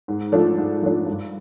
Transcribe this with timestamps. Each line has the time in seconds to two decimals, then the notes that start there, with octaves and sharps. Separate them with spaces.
0.08 G#2
0.32 F3 A3 D4
0.58 G#2
0.82 F3 A3 D4
1.06 G2